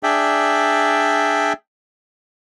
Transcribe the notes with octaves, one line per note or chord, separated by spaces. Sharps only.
D4 G#4 D5 E5 G5